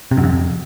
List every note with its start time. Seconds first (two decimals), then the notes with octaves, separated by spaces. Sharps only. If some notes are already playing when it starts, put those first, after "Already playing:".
0.11 C3
0.17 F#2
0.23 F2